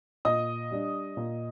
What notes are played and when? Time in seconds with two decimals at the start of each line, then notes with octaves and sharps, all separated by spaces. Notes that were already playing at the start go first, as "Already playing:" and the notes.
0.25 A#2 D#5 D#6
0.71 G3 D4
1.17 A#2